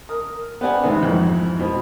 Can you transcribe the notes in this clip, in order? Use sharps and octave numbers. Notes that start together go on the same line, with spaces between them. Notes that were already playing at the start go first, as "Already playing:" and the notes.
A#4 D#6
B3 G4 C5 D5 F#5 G#5
G#2 C3 D#3 B3 C4
F2 G#2 E3
B2 C4